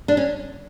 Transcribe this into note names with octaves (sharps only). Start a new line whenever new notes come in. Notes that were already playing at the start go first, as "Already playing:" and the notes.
D4
C#4